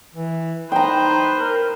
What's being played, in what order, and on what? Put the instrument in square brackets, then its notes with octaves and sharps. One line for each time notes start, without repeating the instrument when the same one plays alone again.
[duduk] E3
[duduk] D#4 [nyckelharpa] B4 C5 [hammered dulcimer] G5 A#5
[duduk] A#4